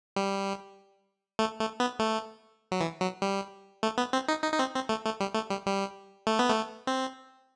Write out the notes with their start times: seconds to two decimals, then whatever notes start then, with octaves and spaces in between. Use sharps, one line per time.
0.16 G3
1.39 A3
1.59 A3
1.80 B3
1.99 A3
2.72 F#3
2.81 E3
3.01 F#3
3.22 G3
3.83 A3
3.98 B3
4.13 C4
4.28 D#4
4.43 D#4
4.53 D#4
4.59 C4
4.75 C4
4.89 A3
5.05 A3
5.20 G3
5.34 A3
5.50 G3
5.66 G3
6.27 A3
6.39 B3
6.50 A3
6.87 C4